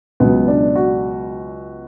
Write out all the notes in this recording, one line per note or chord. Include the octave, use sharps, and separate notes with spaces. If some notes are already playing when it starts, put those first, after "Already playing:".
C#2 B2 F#3 B3
D4
F#4